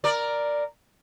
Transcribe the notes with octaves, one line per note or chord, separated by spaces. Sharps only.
A#4 D5